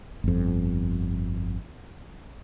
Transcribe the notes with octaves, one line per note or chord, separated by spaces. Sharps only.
G1 F2